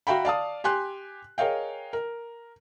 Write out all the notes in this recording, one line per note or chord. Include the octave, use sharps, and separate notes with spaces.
F#4 E5 F5 G5 A#5 B5
D5 F5 A5 D#6
G4 G#5 C6 F#6
G#4 A#4 C#5 D#5 F5 G5
A#4